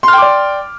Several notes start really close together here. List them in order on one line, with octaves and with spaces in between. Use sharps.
C6 F6 G5 D6 D5